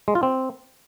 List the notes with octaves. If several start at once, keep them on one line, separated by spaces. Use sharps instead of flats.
G#3
F4
C4